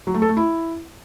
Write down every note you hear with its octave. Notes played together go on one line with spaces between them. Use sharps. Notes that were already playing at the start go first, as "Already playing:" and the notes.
F#3
A3
A4
A3
E4